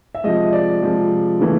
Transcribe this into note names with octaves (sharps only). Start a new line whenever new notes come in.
E5
C3 F3 G#3 D#5
D5
C3 F3 G#3
C#3 E3 A3